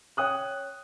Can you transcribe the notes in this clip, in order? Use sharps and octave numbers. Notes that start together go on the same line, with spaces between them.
C#5 G5 D#6 F#6